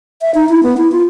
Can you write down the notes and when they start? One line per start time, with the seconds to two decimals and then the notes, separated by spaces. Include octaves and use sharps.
0.22 E5
0.35 D#4
0.49 E4
0.63 B3
0.77 E4
0.92 F4